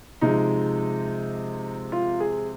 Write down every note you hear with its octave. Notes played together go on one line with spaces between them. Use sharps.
C3 F3 G#3 D#4
F4
G#4